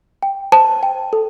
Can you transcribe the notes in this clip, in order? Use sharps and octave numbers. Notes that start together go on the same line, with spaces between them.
G5
C5 A5
G5
A4